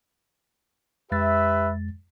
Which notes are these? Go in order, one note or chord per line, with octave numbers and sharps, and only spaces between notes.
F2 G#3 G4 B4 E5 A6